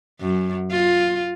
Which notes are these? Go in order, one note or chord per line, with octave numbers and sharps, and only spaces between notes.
F#2
F4